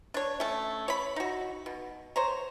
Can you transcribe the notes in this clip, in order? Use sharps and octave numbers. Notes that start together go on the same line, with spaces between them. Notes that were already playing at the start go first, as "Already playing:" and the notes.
D4 C#5
A3 C#4
C#5 B5
D#4 F#4
B2
C5 C#5 A#5